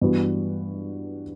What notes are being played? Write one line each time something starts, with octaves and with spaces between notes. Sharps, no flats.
G2 E3 B3 F#4 B4